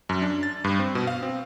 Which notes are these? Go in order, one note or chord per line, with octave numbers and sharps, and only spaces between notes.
F#2
D4
A6
G2
C4
B2
F5
C4